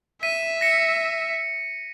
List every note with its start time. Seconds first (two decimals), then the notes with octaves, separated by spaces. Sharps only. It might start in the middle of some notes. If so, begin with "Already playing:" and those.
0.22 E5 B6 D#7
0.61 A#6 C#7